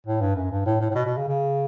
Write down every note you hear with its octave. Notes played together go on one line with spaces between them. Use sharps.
A2
G2
F#2
G2
A2
A2
A2
B2
B2
C#3
C#3